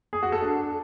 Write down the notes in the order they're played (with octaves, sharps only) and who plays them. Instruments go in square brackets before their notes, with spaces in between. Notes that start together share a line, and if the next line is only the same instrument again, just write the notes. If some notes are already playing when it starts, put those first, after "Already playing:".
[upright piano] G#4
F#4
A4
D4